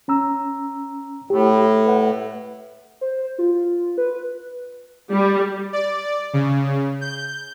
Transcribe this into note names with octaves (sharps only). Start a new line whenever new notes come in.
C#4 A#5 E6
A2 G4
B4 F#5
C5
F4
B4
G3
D5
C#3
G6